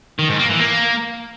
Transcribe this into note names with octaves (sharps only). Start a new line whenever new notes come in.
D#3
G#2
A#3
E3
A#3